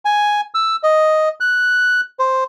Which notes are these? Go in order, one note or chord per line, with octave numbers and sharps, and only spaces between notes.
G#5
E6
D#5
F#6
C5